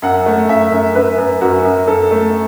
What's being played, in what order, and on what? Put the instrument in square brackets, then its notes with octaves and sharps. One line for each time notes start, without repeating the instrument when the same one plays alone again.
[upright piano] F#2 F#5
A3
F#2 E5
F#2
F#2 B4
F#2
F#2 F#4
F#2
F#2 A4
A3